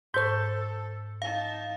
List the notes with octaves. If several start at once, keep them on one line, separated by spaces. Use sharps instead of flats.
G#2 A4 C5 C#6 G6
D#4 F5 A5